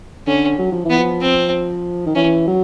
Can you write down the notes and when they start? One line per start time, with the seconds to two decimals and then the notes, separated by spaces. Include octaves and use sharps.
0.27 D3 C#4
0.59 F#3
0.72 F3
0.85 E3 B3
0.99 F3
1.22 C4
2.06 D#3
2.15 E3 C#4
2.47 F#3